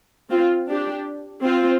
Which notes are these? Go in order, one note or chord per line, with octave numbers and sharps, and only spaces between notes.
C4 F4
D4 G4
C4 F4